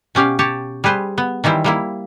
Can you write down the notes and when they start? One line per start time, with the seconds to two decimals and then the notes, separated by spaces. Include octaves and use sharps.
0.15 B2 C#4 G4 F5
0.39 G4 C#5 A5
0.84 G3 G#4 B4 C5
1.18 B3
1.44 D#3 E3 G3 E4 C5
1.64 G3 A#3 E4